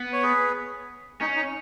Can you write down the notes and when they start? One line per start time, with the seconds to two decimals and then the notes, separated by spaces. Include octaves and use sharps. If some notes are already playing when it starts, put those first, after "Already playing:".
Already playing: B3
0.13 C#5
0.23 G#4 B4
1.21 C#4 D#4
1.36 D#4